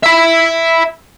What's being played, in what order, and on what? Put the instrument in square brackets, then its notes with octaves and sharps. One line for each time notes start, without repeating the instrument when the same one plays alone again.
[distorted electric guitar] E5 B5